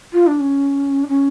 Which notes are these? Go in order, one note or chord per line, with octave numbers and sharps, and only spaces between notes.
F4
D4
C#4
D4
C#4